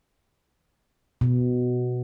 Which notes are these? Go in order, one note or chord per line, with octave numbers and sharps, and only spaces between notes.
B2